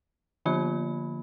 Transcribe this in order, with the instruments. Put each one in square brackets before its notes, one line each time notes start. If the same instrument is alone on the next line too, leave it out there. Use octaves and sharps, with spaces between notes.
[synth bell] D3 F3 A#3 F4 B5